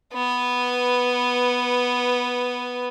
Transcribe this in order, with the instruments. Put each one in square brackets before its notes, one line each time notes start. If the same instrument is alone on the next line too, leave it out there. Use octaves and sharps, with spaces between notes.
[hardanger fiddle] B3 B4